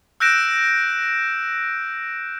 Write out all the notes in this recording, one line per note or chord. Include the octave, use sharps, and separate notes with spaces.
E6 F#6 G6 A#6 D7 E7